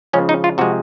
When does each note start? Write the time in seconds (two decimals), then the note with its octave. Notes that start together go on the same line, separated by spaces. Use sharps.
0.13 C#3 F3 G#3 C#4
0.29 D#4
0.44 F4
0.58 C3 F3 G#3 C4 F#4